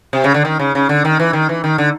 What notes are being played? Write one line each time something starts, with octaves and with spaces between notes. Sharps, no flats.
C3
C#3
D3
D#3
C#3
C#3
D3
D#3
E3
D#3
E3
D#3
D3